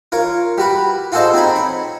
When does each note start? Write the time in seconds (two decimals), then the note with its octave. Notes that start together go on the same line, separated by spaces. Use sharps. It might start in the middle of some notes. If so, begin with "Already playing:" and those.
0.12 F4 A#4 C#5
0.58 G3 F#4 B4
1.12 F4 F#4 G#4 A4 C5 D#5
1.33 C4 D#4 G#5 B5
1.56 C#5